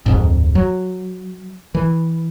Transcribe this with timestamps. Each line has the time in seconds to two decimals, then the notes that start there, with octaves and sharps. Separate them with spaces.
0.06 D1 F2 G#2
0.55 F#3
1.75 E3